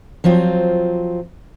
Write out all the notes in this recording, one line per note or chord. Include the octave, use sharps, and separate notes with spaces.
F3 F#3 C4 F4